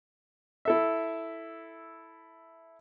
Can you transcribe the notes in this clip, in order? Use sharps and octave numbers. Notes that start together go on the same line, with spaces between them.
E4 A4 E5